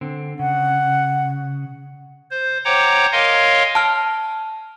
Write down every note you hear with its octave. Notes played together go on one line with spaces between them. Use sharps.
D3 C4
C#3 F#5
C5
C5 C#5 F#5 G5 A#5 D6
A#4 C#5 D#5 F5 G#5 C6
A5 F6